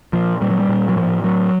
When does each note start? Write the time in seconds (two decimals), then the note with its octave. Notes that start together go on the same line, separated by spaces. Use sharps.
0.13 A#2 F3
0.41 A#2 G3
0.51 F#3
0.59 G3
0.69 A#2
0.89 F#3
0.96 A2 F3
1.24 A2 F#3